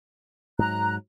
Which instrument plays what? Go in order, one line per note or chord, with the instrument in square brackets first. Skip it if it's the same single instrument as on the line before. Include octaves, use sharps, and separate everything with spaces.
[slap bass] G#2 F#3 [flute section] A#5 F#6